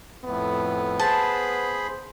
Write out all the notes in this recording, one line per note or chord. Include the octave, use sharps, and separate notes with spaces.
F2 A2 B3
G#4 C5 A5 B5